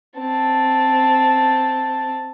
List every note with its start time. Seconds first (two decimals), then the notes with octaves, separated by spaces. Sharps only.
0.19 C4 A5